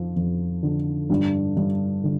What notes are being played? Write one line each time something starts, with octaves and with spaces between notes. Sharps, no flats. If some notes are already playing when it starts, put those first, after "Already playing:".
Already playing: F2 F3
F2
D3
G2 D4
G2
D3